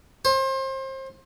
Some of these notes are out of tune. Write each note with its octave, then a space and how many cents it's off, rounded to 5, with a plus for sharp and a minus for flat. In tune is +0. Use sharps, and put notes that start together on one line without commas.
C5 +30